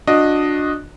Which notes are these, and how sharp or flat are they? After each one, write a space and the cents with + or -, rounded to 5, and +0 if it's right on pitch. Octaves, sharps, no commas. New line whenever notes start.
D4 +5 F#4 -35 D#5 +0